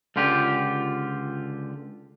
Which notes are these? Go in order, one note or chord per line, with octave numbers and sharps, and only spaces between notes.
C#2 D3 F4 G4